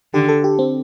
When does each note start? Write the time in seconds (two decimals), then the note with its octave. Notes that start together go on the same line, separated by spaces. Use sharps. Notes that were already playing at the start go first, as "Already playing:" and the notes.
0.14 D3 G4
0.29 A4
0.44 G4
0.59 C4